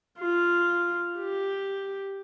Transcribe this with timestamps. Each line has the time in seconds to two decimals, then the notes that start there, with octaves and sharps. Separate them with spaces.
0.19 F4
1.20 G4